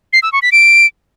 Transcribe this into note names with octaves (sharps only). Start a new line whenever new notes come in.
C7
E6
C#6
B6
D7